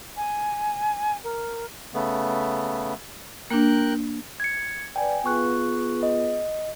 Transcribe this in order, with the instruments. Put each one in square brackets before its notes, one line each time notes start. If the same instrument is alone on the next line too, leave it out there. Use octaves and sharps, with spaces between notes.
[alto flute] G#5
A#4
[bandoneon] C#3 A3 B3
[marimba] A#3 D4 [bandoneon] A#4 G5 F#6
[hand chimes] G#6 C#7
[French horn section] B4 D5 [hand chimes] G5 G#5
[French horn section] B3 F4 G#4 [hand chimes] C#6 F#6
[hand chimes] D#5